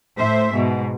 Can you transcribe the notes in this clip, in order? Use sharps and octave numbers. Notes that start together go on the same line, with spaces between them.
A2 C5 E5
G#2 B2